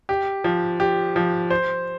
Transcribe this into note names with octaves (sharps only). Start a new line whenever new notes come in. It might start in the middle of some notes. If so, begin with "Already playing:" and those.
G4
F3
G4
F3
C5